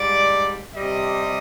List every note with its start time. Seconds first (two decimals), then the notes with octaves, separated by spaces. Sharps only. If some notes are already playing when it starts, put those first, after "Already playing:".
Already playing: G#2 G3 D5
0.75 C3 G3 D#5